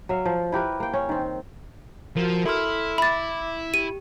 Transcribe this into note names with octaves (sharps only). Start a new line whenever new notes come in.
F#3 E5 F5
F3
E4 G4 A#4 B4
A#3 G5
C#4
D#3 C4
F3 F#4 A#4
E4 A4 C6 F6
E5 B5 D6 A6
G4 D#7